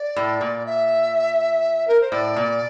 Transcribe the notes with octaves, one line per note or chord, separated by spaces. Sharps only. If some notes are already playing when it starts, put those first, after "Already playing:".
Already playing: D5
A2
A#2
E5
A#4
C5
A2 D5
A#2